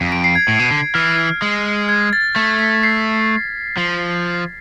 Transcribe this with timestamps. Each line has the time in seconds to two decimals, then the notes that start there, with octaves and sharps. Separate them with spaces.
0.01 F2
0.12 D7
0.24 C7
0.35 G#6
0.48 A2
0.59 B2
0.71 D3
0.94 E3 F6
1.42 G#3
1.89 G#6
2.13 A6
2.36 A3 A6
2.59 B6
2.83 C7
3.77 F3